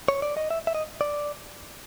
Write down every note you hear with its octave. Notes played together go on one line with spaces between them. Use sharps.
C#5
D5
D#5
E5
E5
D#5
D5